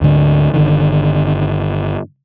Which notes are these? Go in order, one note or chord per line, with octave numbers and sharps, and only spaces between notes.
D2 G#2 D3
G1 D3 D#3